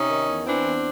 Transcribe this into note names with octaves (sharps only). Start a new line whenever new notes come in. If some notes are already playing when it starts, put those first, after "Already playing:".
Already playing: C3 C#4 D#4
D#3
E2
E3 C4 D4
E2